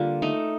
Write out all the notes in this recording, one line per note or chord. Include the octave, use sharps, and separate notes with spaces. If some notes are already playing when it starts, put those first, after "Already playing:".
Already playing: D3 G3 A#3 F4
A3 D#4